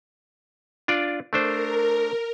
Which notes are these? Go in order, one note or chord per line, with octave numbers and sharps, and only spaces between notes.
D4 F4 D5
A3 D4 A#4 C5